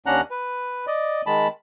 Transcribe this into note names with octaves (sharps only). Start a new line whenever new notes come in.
D#2 C#4 D4 F#5 A#5 F#6
B4
D5 D#5
D#3 G#3 A5 B5